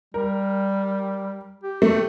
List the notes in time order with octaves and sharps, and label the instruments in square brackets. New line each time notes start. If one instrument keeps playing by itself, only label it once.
[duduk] G3 [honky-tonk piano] A#4
[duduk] G4
[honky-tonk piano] A3